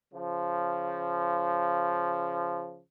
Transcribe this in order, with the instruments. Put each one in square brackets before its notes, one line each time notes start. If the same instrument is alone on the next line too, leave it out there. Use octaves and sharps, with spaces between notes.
[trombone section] C#3 F3